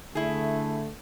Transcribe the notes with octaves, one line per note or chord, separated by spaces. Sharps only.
D3 A3 E4 G#4